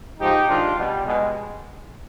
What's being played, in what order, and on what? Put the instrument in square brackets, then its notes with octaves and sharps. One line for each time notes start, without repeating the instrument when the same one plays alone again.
[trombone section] G#2 F3 D#4 G4
G#2 D#3 D4 F4
B2 G3
B2 G#3